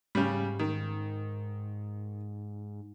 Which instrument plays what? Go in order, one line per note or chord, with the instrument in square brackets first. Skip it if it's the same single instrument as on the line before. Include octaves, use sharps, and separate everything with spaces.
[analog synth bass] G#2 [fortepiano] C#3 G3
[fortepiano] D#3